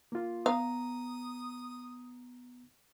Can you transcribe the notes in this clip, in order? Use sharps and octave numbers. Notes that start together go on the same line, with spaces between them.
A#3 F4
B3 F5 A#5 D#6